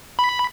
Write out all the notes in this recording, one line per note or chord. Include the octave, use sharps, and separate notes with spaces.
B5